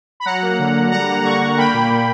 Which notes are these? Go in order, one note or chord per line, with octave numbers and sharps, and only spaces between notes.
B5
F#3 F#5 A#5
A#3
D3
D3
G3 F#5 A#5
A#3
D3 A#5 C#6
D3
A#3 G5 B5
A#2
A#2